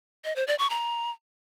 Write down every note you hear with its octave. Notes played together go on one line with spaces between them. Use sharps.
D#5
C5
D5
C#6
A#5